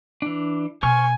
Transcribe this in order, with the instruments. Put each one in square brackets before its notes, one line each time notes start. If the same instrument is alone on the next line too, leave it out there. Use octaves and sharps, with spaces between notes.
[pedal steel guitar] E3 D4
[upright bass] B2 [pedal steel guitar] C5 C#6 F6 [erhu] G#5